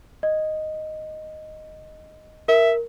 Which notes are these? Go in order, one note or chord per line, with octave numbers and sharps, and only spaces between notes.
D#5
A#4 E5